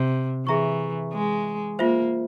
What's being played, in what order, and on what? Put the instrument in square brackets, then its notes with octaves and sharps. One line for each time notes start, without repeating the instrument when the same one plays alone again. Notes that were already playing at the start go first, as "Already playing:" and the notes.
Already playing: [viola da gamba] C3
[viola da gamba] E3 [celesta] G#4 E5 A#5 C#6
[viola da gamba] G#3
[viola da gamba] A#3 [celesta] F4 C5 E5